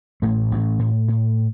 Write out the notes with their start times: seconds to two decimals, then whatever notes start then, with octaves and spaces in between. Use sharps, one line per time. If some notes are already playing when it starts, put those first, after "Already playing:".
0.22 A1 A2 A3
0.51 A1
0.79 A2
1.08 A2